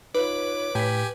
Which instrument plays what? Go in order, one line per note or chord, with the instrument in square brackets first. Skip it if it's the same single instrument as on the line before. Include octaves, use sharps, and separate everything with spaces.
[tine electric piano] D#4 F4 [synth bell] B4 [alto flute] C#5 [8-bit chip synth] D6
[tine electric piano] A2 B6 [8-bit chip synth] G4 G#5